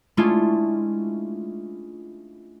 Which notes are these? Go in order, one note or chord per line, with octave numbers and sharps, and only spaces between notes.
G#3 A3 C#4 D4 E4 F4